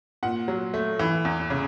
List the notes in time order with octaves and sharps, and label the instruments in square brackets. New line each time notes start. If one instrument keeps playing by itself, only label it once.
[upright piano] A#2 F#5
F#3
A3
E3
E2
C#3